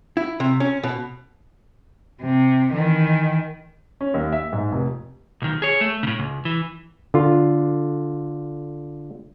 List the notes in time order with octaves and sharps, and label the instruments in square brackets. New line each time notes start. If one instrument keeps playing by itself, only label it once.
[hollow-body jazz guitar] E4
C3
C#4
B2
[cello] C3
D#3 E3
[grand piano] C#4
D#2
E5
G#2
F1
[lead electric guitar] B1 D#3
G#4 C#5
A3
A2 C#3
C#2
E3
[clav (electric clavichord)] D3 F4